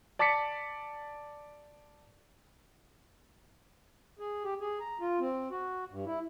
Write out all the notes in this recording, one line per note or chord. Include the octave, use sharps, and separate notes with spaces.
D5 A5 D6 A6 B6 C#7
G#4
G4
G#4
A#5
F4
C4
F#4
G2
E4